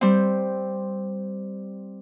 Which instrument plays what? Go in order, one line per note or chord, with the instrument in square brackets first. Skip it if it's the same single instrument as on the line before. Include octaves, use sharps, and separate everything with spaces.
[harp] G3 C4